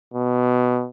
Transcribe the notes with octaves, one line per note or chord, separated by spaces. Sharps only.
B2